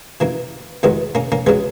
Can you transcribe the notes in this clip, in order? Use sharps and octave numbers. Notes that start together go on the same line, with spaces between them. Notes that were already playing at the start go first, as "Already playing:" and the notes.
F#2 E3 A#3
E2 D#3 F#3 G#3 B3
A#3 C#4
A#3 C#4
C#3 F#3 G#3 B3